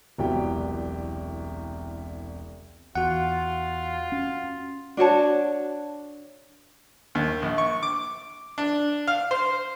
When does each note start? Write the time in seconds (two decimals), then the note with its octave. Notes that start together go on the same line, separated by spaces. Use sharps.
0.18 E1 C2 F#3 B3 G4 G5
2.95 E2 F4 F#4 F#5
4.12 C#4
4.97 D4 F#4 C#5 A5
7.15 D#2
7.42 A#1
7.58 C#6
7.83 D6
8.58 D4
9.07 F5
9.31 C5